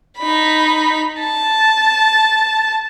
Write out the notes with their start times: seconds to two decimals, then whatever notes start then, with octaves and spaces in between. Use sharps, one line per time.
0.18 D#4 B5
1.20 A5